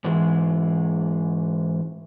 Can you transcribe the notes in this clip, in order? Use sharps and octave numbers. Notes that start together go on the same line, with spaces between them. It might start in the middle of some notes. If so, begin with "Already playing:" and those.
G#2 E3 G#3